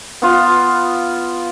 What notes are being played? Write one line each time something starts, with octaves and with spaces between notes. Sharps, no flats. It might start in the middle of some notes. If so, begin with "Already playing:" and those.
B3 F4